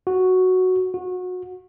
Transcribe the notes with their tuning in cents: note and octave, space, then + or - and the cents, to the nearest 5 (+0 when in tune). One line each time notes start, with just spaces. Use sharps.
F#4 +0
F#4 -25